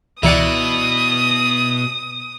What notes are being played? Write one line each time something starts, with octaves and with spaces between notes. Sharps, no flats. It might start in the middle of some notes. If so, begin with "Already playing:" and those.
C#2 B2 E3 E4 D5 F#5 D#6 C#7